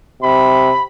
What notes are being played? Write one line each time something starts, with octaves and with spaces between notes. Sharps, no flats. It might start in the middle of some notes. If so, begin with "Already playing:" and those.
C3 B5